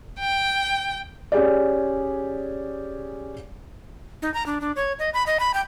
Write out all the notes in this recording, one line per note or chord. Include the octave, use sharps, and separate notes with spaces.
G5
C#4 G4 G#4 D5
D#4
A#5
D4
D4
C#5
D#5
B5
D#5
B5
G5